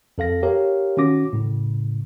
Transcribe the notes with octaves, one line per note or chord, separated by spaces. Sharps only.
F2 A4 F5 A#6
G4 A#4 C#5 F5
D#3 C#4 F#4 D6 A#6
A2 C#3